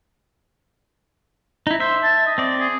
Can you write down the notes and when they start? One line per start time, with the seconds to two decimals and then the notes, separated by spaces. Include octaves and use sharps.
1.67 D#4 E4
1.80 C5 E5
2.03 A5
2.26 D#5
2.38 C4 D5
2.60 G#4